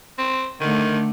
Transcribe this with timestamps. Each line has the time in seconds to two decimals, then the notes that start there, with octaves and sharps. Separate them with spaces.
0.18 C4
0.60 D3 D#3 A3